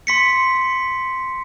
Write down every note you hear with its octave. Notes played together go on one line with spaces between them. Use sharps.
C6 B6 C#7